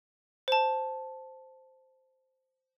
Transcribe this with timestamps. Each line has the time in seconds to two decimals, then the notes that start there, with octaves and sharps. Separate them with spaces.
0.48 C5 A5